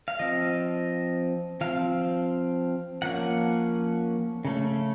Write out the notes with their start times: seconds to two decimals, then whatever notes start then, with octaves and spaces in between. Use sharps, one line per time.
0.08 F5
0.19 F3 C4 D#5
1.61 F3 C4 F5
3.02 F3 A#3 C#4 F#5
4.45 C#3 A3 C#4